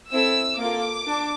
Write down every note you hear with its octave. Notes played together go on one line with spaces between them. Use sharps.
C4 E4 A4 E6
A#3 F4 A4 D6
D4